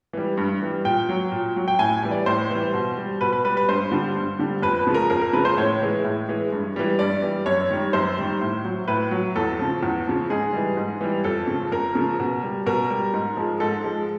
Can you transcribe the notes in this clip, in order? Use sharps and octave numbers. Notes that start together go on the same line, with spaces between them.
E3 G3
G2
E3 G3
A#2 G5
F#3
A#2
F#3
G5
A2 G#5
E3 G3
D5
A2 C5
E3 G3
B2
G3
B2 B4
B4
G3 B4
B4
G2 C5
D3 G3
G2
D3 G3
F2 B4
B4
C#3 F3 G#3
A#4
F2 A#4
A#4
C#3 F3 G#3 B4
C5
A2 C#5
E3 G#3
A2
E3 G#3
G2
E3 G3
G2 D5
E3 G3
F#2 C#5
D#3 G3
F#2 C5
D#3 G3
A2
F#3
A2 B4
F#3
E2 A4
C#3 F3
E2
C#3 F3
G#2 G#4
E3 G3
G#2
E3 G3
F2 A4
C#3 F3
F2 A#4
C#3 F3
B2
G3
B2 A#4
G3
G#2
F3 G#3
G#2 A4
F3 G#3